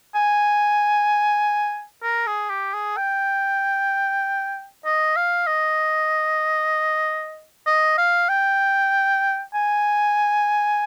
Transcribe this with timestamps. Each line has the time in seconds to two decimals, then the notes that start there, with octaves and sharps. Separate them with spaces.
0.15 G#5
2.03 A#4
2.27 G#4
2.50 G4
2.74 G#4
2.97 G5
4.85 D#5
5.16 F5
5.47 D#5
7.67 D#5
7.98 F5
8.29 G5
9.54 G#5